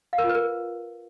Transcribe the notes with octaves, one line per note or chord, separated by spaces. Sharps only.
F5
A#4
F4
B4
A#4